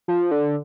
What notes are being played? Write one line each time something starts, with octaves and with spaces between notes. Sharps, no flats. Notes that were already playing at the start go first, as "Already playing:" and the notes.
F3
D3